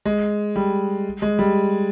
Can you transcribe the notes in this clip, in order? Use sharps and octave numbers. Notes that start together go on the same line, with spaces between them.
G#3
G3
G#3
G3